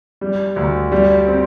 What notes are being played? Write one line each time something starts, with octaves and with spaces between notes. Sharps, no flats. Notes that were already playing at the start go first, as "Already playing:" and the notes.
G3
D2
G3
C4